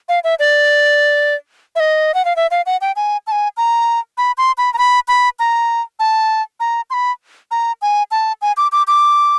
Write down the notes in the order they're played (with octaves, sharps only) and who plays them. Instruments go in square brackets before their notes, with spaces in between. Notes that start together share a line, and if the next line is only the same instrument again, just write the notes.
[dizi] F5
E5
D5
E5
D#5
F#5
F5
E5
F5
F#5
G5
G#5
A5
G#5
A#5
B5
C6
B5
A#5
B5
B5
A#5
A5
A#5
C6
B5
A#5
G#5
A5
G#5
D6
D6
D6